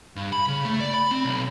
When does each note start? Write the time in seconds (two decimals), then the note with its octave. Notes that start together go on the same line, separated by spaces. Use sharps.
0.16 G2
0.33 B5
0.48 C#3
0.65 A3
0.80 D5
0.94 B5
1.11 C4
1.25 B1